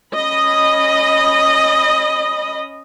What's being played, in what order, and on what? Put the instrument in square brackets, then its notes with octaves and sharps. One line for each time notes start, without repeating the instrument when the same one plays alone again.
[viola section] C#4 D#5 B5